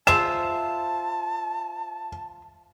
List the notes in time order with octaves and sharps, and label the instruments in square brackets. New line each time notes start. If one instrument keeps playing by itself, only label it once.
[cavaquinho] F4 C5 E5 [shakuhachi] A5 [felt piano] E7